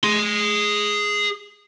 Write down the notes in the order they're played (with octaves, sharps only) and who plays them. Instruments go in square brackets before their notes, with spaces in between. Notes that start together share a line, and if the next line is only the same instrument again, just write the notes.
[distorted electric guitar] G#4 C6